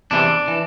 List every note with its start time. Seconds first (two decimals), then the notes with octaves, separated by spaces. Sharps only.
0.11 E2 C3 E3 D4
0.48 E3